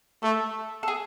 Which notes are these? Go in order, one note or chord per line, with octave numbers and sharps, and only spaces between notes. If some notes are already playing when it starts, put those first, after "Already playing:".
A3 A4
A4
G#4